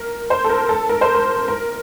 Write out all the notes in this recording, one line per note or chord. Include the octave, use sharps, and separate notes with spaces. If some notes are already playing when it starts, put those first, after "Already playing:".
Already playing: A#4
C5
A4
A#4
A4
A#4
C5
A#4
A#4